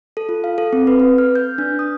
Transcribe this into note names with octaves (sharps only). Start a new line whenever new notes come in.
A4
F4
F5
A4
C4
B4
B4
F6
G6
D4
D#6